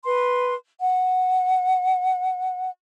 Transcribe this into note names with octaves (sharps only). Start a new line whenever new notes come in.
B4 C6
F#5